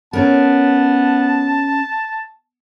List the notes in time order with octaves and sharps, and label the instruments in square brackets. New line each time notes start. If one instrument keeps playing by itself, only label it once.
[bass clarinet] B3 [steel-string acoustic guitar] C#4 A#4 [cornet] A5